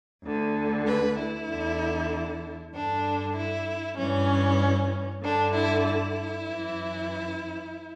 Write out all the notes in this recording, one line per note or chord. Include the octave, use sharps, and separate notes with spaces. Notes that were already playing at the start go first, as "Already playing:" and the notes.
D2 D3
B4
E4
E2 D3
G2 D3 D4
E4
G2 E3 C#4
G2 D3 D4
E4
E4
F#2 E3